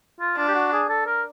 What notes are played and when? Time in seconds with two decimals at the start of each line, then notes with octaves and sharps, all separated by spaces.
0.20 F4
0.37 D4 F4
0.48 G4
0.55 F#4
0.72 G#4
0.89 A4
1.06 A#4